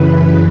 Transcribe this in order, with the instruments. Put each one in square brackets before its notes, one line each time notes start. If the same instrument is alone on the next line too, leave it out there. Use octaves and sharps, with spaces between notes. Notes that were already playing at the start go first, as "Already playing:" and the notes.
Already playing: [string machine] F#2 C#3 E3 B4